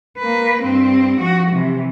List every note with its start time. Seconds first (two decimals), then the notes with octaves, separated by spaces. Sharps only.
0.18 A#3 B4
0.63 G2 C4
1.19 F3 F#4
1.52 C3 E3